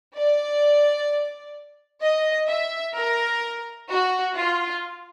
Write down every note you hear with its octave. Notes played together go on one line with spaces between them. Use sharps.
D5
D#5
E5
A#4
F#4
F4